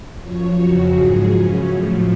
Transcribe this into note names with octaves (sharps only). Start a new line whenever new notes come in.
F#2 F3 C#5
F2 C#3 F#3 F#4
G#2 F3 G#4
F#2 C#3 F#3 C#4
A2 F3 A3